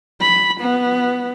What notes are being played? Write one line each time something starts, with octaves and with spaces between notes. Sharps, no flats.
B5
B3